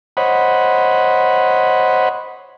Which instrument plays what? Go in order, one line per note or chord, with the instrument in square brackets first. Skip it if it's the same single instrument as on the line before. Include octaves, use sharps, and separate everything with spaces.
[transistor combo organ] C5 C#5 D#5 F#5 B5